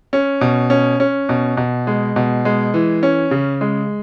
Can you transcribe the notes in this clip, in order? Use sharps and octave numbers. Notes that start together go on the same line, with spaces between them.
C#4
B2
C#4
C#4
B2
B2
G#3
B2
G#3
E3
C#4
C#3
G#3